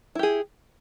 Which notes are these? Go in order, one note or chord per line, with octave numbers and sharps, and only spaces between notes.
E4 G4 G#4